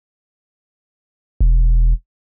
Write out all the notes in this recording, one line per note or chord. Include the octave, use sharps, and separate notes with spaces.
E1